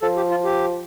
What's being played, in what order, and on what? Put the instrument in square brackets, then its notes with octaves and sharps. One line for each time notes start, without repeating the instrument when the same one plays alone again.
[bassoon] F3 [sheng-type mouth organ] A4
[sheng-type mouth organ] G4
F4
G4